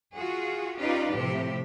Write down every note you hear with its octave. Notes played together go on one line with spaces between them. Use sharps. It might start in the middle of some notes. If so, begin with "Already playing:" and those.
F4 F#4 G#4
C#4 D#4 F4 G4 B4 D5
A2 C3 F3 G4 E5